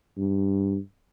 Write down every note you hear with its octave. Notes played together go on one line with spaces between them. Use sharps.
G2